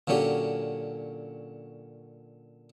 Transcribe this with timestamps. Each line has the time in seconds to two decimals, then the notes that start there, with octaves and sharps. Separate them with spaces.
0.08 A#2 D3 F#3 C#4 G4